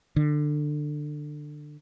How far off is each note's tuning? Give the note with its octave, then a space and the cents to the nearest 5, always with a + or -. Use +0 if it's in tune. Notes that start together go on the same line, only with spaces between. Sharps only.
D3 +20